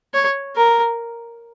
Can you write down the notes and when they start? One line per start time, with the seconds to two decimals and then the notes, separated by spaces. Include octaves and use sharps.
0.14 C#5
0.56 A#4